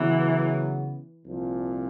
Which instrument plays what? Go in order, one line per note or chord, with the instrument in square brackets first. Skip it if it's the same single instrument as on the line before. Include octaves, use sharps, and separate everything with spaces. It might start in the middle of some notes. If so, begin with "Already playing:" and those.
Already playing: [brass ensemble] C#3 F#3 B3 [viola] E3
[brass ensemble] C2 A#2 F3